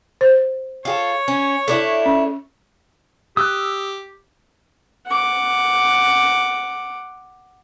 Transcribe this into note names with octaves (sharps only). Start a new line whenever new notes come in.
C5
F4 G4 A4 C#5
C#4
A3 D4 E4
C#4
G4 D#6 E6 F#6
F#5 D6